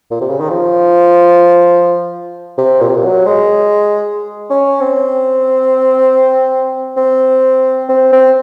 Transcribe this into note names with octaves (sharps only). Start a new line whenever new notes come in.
A#2
C3
C#3
D#3
F3
C3
A#2
C3
A#2
F#3
G#3
C#4
C4
C4
C4
C4